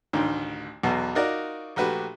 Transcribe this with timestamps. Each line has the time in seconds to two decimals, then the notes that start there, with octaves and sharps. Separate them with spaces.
0.13 A1 D2 D#3
0.83 B1 E2 B2
1.15 D#4 F4 F#4 A#4 D5
1.76 A#1 A3 F#4 G4 B4